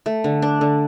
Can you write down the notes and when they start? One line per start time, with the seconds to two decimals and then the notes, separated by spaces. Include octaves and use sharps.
0.06 A3
0.24 D3
0.42 D4
0.61 D3